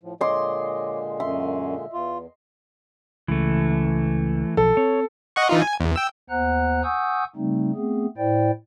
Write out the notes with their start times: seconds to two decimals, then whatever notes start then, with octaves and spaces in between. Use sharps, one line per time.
0.03 A2 F3
0.21 A#2 D3 G#3 C#5 D#5 C6 D6
1.20 F#2 E5 C6
1.93 E2 F4
3.28 C#2 C#3 E3 A3
4.57 B1 F3 A4
4.77 C4 C#5
5.36 D#5 F#5 C#6
5.49 E3 D#4 F4
5.62 G#5
5.80 E2
5.96 G5 E6
6.30 D#2 B3 C5 F#5 A#5 F#6
6.83 F#5 G#5 C#6 D#6 E6 G6
7.36 C#3 G3 A3 C4 D#4
7.75 A3 B3 C4 G#4
8.17 A2 E4 C5 D5 G5